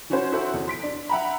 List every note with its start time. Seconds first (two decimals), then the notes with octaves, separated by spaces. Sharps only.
0.10 E3 C#4 F#4 C5 C#5
0.32 E4 F#4 A4 C5 E5 F#5
0.54 E2
0.68 C6 B6 D7
0.83 D4
1.09 E5 F#5 G5 A#5 B5